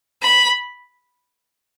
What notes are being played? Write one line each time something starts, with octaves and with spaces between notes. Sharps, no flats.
B5